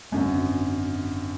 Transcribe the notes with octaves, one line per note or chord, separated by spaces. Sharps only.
G#1 F#2 D3